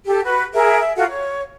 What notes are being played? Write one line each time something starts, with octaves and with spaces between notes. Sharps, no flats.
G4 A4
F#4 B4
G#4 A#4 E5
E5
F4 F#4 A4 F#5
C#5